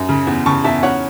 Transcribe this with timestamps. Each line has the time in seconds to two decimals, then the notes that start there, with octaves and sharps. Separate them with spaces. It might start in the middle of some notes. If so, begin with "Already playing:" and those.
Already playing: F#2
0.09 C#3
0.27 E2
0.46 C#3 A5 C#6
0.64 E2 E5 A5
0.83 C#4 C#5 F#5